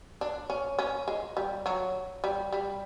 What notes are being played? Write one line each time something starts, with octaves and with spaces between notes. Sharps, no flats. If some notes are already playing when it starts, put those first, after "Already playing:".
D4
C#4
C#4
G#3
G3
F#3
G3
G3